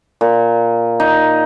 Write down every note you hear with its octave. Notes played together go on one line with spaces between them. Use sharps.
A#2
D#4